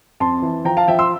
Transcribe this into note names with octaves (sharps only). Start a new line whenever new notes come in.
F2 A5 C6
E3
F3 G5 A#5
F5 A5
F3 E5 G5
C6 E6